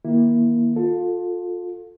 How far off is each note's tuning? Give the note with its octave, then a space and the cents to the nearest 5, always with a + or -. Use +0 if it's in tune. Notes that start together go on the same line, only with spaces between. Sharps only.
D#3 +0 A#3 +20 E4 +0
F4 +25 A4 +5